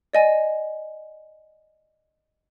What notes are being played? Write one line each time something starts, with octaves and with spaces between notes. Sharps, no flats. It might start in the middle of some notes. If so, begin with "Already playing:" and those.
D5 D#5 G#5